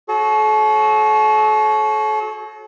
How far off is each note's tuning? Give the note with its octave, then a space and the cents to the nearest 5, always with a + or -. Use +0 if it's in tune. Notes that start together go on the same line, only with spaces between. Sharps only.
F#4 +0 A4 -40 C#5 -35